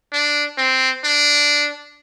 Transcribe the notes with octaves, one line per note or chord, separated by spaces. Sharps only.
D4
C4
D4